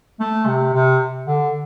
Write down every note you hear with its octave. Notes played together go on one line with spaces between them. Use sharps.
A3
C3
C3
D3